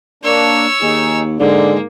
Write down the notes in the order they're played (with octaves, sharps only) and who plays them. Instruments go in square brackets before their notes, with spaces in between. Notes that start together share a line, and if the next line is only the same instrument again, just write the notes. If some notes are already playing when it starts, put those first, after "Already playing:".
[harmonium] A#3 D4 [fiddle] C#5 E6
[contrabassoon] D#2 [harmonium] D#4 G#4
[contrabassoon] G#2 [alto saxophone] D3 [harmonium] G#3 [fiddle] A#3